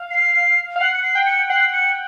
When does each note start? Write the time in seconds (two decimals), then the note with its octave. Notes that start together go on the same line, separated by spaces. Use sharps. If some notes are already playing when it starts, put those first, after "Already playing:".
Already playing: F5
0.11 C7
0.76 F5
0.80 F#5 C7
0.94 C#7
1.03 C7
1.15 G5
1.26 C#7
1.49 F#5 C7
1.73 C#7